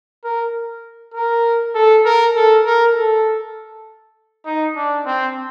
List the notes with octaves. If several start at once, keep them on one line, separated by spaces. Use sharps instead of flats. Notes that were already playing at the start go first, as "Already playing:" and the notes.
A#4
A#4
A4
A#4
A4
A#4
A4
D#4
D4
C4